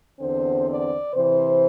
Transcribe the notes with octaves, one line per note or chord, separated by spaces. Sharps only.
E2 D3 C4 C5
D5
C3 E3 C4 C5